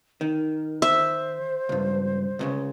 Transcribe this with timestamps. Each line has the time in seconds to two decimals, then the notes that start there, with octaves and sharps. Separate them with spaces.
0.21 D#3 A#4
0.82 C5 E5
1.69 C#2 G2
2.39 C#2 A2 C#3